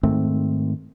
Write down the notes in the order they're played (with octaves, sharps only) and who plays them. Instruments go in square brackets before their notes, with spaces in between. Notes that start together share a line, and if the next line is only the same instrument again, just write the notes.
[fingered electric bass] G#2 D#3 A3 C4